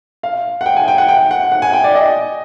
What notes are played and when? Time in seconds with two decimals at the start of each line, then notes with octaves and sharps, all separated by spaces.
0.23 F5
0.61 F#5
0.66 G5
0.76 G#5
0.88 G5
0.98 F#5
1.09 G5
1.31 F#5
1.52 F#5
1.62 G#5
1.73 G5
1.84 D5
1.95 D#5